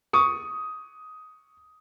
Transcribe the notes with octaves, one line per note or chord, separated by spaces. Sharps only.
C#6 D#6